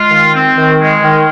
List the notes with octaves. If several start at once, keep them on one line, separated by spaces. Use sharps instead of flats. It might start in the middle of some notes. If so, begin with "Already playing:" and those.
Already playing: G#3 F4
D#3
C4
D#3
G#3
D#3